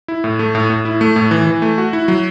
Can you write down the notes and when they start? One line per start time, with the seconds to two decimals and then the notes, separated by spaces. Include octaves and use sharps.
0.08 E4
0.24 A2
0.39 A3
0.55 A2
0.70 A2
0.85 E4
1.01 A3
1.16 A2
1.31 E3
1.47 E3
1.62 A3
1.78 F#4
1.93 E4
2.08 F#3